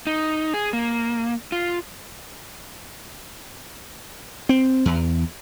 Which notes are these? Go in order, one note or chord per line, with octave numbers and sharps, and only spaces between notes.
D#4
G#4
A#3
F4
C4
E2